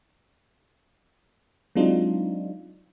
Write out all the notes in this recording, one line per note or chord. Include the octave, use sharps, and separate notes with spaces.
F#3 G#3 C4 D4 D#4 F4